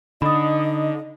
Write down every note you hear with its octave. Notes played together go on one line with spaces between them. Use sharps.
D3 D#4 D#5 B5 D#6